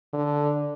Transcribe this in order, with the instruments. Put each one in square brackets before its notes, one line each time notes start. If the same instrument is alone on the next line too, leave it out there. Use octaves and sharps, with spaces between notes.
[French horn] D3